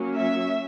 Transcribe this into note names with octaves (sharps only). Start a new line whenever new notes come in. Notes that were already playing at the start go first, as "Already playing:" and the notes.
Already playing: F#3 A#3 C#4
E5